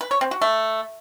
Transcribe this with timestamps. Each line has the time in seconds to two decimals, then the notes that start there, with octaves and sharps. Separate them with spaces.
0.01 B4
0.11 C#5
0.21 C4
0.31 F#4
0.42 A3